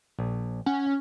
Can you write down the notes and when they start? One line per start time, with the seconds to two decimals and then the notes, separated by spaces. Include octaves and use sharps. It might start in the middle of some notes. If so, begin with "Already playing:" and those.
0.19 A#1
0.66 C#4 F#5